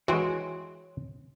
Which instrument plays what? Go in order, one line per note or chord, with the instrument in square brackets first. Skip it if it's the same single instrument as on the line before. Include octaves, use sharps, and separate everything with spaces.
[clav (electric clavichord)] E3 G#3 [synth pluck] F#4 [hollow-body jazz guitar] C#5 G5 C6